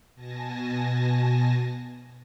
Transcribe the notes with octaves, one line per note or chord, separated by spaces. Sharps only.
B2 G#5 A5 A#6